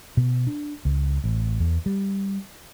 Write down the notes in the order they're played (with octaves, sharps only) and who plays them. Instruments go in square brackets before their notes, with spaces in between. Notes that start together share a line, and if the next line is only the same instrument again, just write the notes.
[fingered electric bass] B2
D4
C#2
A1
E2
G3